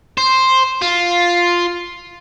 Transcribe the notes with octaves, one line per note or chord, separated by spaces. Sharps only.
C5
F4